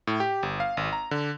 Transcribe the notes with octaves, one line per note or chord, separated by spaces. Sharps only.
A2
G4
G1
F5
G#1
A#5
D3